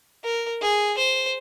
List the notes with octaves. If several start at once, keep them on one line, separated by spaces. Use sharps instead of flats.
A#4
G#4
C5